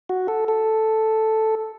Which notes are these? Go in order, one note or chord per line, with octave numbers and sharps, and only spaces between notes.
F#4
A4
A4